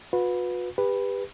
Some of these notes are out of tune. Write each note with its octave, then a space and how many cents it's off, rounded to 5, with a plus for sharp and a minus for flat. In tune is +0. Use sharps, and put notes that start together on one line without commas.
F#4 -45 B4 +0
G4 +30 B4 +0